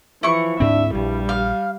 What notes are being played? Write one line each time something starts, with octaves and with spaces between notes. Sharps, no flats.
E3 F3 E4 C#6
D2 G#2 C4 D4 E5
A#1 G2 G3
F5